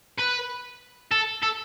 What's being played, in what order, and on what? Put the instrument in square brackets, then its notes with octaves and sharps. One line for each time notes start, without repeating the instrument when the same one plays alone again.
[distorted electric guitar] B4
A4
A4